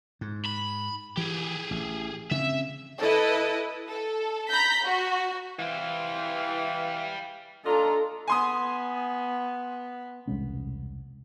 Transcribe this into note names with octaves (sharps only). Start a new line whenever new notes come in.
G#2
B5
E3 G4 G#4
A1
C#3 A3 C4 E5
E4 A4 B4 D#5
A4
A#5 B5 G6 A#6 B6
F#4
E3 G3 C5 F5
D4 F4 A4 D#5 A#5
B3 G#5 C6 D#6
E1 C2 G#3 C#4